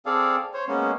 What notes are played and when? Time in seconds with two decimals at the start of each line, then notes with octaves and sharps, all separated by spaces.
0.06 C4 G#4 A4 D5 F5
0.54 C5 C#5
0.68 G#3 A#3 B3 C#4